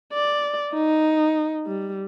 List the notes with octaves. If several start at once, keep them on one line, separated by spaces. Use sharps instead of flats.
D5
D#4
G3